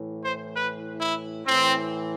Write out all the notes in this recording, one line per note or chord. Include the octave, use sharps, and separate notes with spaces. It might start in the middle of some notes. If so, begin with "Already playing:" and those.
Already playing: A2 E3
C5
B4
E4
A2 E3 C4